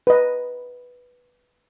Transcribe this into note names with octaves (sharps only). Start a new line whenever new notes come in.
B4 D#5